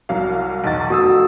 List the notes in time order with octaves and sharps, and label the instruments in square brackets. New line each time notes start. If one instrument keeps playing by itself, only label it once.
[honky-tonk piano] C2 F#3 F5
B1 E2 A6
[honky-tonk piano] F1 [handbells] F#4 D#6 E6